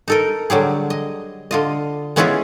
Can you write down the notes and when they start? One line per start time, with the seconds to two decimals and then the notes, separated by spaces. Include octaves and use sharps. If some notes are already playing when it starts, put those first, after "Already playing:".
0.08 D#4 A4 A#4
0.50 D3 F#3 G3 G#4
0.90 D#5
1.51 D3 F4 D#5
2.16 G#3 B3 C#4 E4 F4 G#4